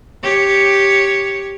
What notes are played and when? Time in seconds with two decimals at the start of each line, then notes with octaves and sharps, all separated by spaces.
0.23 G4 C#5